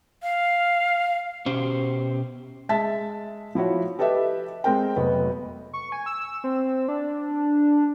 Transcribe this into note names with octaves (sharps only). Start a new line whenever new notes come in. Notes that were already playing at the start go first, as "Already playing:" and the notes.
F5
B2 C#4 G4 C5
G#3 E5 A5 A6 B6
F3 E4 F#4 C#5
G4 A4 B4 D#5 E5
G#3 C4 A#4 G5
F1 F#3 B3 F#4 D#5
C#6
G#5
E6
C4
D4